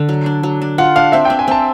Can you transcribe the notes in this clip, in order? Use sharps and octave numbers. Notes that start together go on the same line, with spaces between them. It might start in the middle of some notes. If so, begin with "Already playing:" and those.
Already playing: D3
F#3
D4
F#3
D4
F4 F#5
D4 F5
C4 E5
C4 G5
G#5
C4 A5